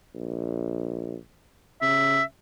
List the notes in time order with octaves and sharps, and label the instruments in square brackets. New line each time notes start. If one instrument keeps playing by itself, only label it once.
[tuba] A#1
[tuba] C#3 [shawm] E5